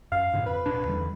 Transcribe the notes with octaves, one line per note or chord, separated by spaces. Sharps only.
F#2 F5
G#2 B2 D3
F2 B4
D1 B2 D4
E2 D3 G3